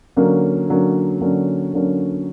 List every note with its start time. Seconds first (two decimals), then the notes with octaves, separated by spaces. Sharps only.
0.17 D3 F#3 A#3 C#4
0.69 D3 F#3 A#3 C#4
1.21 D3 F#3 A#3 C#4
1.73 D3 F#3 A#3 C#4